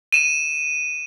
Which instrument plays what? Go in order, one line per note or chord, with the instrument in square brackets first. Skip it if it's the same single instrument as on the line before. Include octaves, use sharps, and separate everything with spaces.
[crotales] D#7 E7